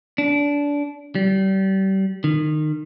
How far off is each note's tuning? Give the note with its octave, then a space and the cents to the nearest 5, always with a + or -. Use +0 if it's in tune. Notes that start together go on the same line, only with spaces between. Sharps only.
D4 -25
G3 -30
D#3 -25